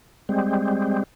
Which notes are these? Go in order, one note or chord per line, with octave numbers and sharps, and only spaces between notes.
G3 G#3 C4